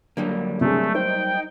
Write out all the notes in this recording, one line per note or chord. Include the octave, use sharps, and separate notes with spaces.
D3 F#3 G3 A#3
C3 A3 G#4
D#4 C5 G5